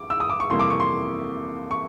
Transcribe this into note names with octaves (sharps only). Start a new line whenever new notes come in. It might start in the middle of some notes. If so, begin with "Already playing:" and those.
Already playing: D6
E6
D#6
D6
C#6
F2 C3 E3 G3 A#3 C6
D6
C#6
C6
C#6